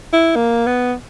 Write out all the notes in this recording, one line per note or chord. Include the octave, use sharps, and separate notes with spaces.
E4
A#3
B3